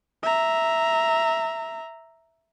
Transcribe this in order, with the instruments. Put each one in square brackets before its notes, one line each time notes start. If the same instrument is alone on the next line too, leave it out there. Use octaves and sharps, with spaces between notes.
[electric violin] E5 A#5